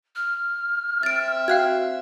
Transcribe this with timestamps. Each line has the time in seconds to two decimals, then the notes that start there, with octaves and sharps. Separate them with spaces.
0.16 F6
1.03 C4 E5 A6 D7
1.48 F#4 F5 G5 F#6 G#6